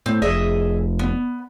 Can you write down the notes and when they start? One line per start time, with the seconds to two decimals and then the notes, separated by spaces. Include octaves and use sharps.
0.06 A2 C4
0.22 F1 G#4 D#5 E5
0.99 B3